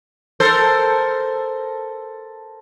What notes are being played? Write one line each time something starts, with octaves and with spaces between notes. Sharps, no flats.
A4 A#4 C5